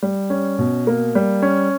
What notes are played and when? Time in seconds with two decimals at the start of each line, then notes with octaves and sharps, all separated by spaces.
0.03 G3
0.30 C#4
0.59 B2
0.87 A#3
1.15 G3
1.42 C#4